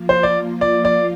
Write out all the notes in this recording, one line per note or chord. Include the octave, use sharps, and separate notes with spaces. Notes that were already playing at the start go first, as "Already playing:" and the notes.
Already playing: F3 A#3 F4
C5
D5
D5
D5